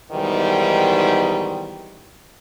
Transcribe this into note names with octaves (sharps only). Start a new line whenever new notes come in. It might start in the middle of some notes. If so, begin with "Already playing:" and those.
G#2 B2 D#3 E3 G3